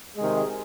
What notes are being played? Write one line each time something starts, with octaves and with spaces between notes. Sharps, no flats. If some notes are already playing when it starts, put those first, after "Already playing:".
C3 D#3 G#3 G#4